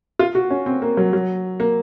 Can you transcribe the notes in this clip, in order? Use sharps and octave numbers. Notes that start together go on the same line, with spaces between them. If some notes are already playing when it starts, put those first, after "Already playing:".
F4
F#4
C#4
C4
A#3
F#3
F#3
A#3